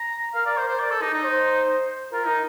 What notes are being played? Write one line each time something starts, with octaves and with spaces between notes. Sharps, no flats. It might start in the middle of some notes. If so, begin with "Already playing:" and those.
Already playing: A#5
A#4 F5
D5
C5
C5
D5
A4
D#4
D#4
C5
F4 A#4
D#4